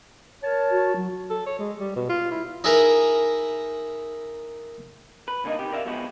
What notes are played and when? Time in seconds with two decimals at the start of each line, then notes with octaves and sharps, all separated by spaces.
0.43 A#4 C#5 A5
0.71 F#4
0.96 F#3
1.30 A4
1.46 C#5
1.59 G#3
1.79 G3
1.96 B2
2.09 F4
2.31 E4
2.64 D#4 E4 G#4 A#4 B4 A#5
5.28 B4
5.44 C2 D3 A#3 D#4 D#5
5.59 C3 D#3 G4
5.73 A#4 D5 E5 F5
5.85 B1 B2 F3 G#3 B3 F#4